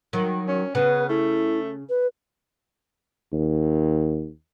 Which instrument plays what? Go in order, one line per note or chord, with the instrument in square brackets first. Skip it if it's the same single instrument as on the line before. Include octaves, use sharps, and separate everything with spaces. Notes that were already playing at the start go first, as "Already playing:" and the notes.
[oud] D#3 F#3
[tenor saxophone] C#4
[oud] C#3 [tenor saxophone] B3 [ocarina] B4
[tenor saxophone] A3 [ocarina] E4
[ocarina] B4
[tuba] D#2